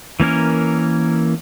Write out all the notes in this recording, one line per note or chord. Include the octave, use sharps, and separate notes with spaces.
E3 A#3 C#4 A#4